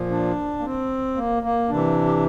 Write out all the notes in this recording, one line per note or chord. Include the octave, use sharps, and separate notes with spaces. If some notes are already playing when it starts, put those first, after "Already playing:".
Already playing: A#2 F3
D4
A#3
C4
A#3
A#3
C3 E3 D4
G4